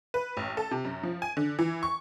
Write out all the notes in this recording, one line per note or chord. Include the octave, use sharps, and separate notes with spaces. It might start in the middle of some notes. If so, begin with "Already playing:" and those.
B4
A1
A4
C3
F#2
F3
G#5
D3
E3
C#6